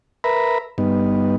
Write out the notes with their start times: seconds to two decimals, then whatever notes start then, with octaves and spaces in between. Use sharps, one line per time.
0.24 A#4 B4 E5 A#5 B5
0.78 G2 B3 D#4